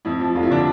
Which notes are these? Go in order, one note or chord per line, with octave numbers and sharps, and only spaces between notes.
F2 E4
F3
F1 F4
E4
D3 D4